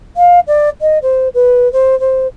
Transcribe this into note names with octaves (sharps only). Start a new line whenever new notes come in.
F5
D5
D#5
C5
B4
C5
C5